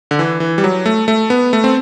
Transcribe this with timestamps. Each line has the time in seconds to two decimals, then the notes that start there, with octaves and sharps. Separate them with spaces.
0.11 D3
0.19 E3
0.40 E3
0.58 G3
0.64 F#3
0.86 A3
1.08 A3
1.30 B3
1.53 A3
1.64 C4